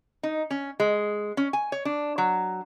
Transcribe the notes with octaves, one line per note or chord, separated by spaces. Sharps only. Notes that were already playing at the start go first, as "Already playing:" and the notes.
D#4
C#4
G#3
C#4
G#5
C#5
D4
F#3